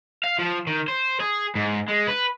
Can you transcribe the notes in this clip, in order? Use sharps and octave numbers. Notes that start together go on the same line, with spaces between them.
F5
F3
D#3
C5
G#4
G#2
G#3
B4